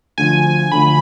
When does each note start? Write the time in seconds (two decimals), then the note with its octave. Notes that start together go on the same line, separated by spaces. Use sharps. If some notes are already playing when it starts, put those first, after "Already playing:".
0.18 D2 D3 F3 G#5
0.72 D2 D3 F3 B5